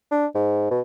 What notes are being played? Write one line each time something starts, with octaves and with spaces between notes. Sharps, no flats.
D4
G#2
B2